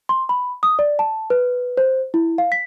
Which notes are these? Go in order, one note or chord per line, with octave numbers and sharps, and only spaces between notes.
C6
B5
D#6
D5
A5
B4
C5
E4
F5
B6